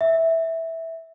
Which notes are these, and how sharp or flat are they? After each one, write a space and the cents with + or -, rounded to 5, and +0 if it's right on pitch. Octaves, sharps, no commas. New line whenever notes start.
E5 -10